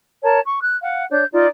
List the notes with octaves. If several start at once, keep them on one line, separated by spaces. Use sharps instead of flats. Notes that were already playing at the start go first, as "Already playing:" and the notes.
A#4 C#5 A5
C#6
F#6
F5 F#5
D4 C#5 G6
D#4 F4 D5